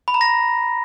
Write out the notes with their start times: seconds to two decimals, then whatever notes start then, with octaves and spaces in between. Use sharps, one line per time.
0.08 B5
0.14 A#5
0.21 A#6